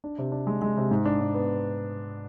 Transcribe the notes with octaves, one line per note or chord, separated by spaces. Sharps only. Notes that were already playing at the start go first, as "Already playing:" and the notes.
D4
C3
D4
G#3
G#3
C3
G#2
D4
G#2
B3